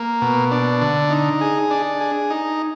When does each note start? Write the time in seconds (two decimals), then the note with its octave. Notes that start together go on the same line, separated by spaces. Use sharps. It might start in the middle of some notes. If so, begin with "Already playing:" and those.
Already playing: A#3
0.22 B2
0.51 D4
0.81 D3
1.10 D#4
1.41 G#4
1.71 D4
2.01 G#4
2.30 D#4